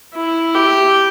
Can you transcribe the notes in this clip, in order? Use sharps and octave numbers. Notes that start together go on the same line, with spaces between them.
E4
G4